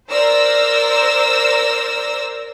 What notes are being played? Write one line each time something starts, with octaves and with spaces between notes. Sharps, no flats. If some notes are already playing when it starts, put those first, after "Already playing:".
A#4 C5 D5 E6 A#6